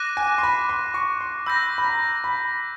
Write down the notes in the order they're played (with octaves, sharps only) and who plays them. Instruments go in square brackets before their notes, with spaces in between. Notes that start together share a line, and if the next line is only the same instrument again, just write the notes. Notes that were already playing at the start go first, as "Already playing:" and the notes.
Already playing: [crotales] D6 F#6 A#6 D#7
[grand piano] G#5
C6
B5
C6
C#6
C6
[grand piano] B5 [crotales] E6 G6 A#6
[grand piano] B5
A#5
B5